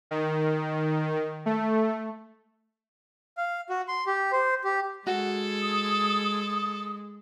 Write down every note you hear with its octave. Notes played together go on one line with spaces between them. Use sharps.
D#3
A3
F5
F#4
C6
G4
C5
G4
G#3 F#4 A4
D#6